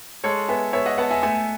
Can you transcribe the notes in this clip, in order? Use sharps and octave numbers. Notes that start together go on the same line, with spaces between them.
G#3 A4 C#5
B3 E5 G#5
B3 C#5 E5
D#5 F#5
B3 F#5 A5
E5 G#5
A3 E5 G#5